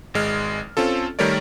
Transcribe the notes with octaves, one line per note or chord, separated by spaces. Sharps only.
G#1 G#3 F6
C4 C#4 F4 A4
D#3 G3 A3 A#4 C#5 D5